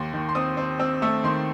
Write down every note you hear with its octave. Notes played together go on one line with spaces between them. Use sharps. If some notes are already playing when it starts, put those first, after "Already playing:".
Already playing: D#2 C6
D#3
C6
C4 D#6
C4
C4 E6
A3 E6
D#3 C6